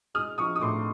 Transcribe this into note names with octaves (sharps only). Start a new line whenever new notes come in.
G#3 D#6 F6
F3 C#6 D#6
D#6
A2 C6 D6